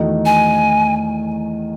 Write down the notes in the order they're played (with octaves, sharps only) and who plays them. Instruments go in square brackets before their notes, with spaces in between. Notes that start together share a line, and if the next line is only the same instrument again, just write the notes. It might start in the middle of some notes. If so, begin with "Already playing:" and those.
Already playing: [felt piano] E2 D#3 A3 D#4 F#4
[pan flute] G#5